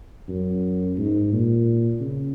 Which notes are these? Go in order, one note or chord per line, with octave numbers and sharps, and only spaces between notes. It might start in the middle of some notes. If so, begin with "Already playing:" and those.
F#2
G#2
A#2
C#3